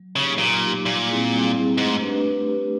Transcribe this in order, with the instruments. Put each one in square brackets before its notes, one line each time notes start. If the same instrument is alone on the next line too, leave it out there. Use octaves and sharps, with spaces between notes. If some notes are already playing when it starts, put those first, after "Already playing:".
Already playing: [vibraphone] F#3
[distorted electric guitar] C#3 [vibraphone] A#3 D#4 G4
[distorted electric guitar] A#2 [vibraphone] F#3
[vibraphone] A#3 D#4 G4
[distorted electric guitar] A#2 [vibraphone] G3
[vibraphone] C4 E4 G#4
G3
C4 E4 G#4
[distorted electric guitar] G#2 [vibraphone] A3
[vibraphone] D4 G4 B4
A3
D4 G4 B4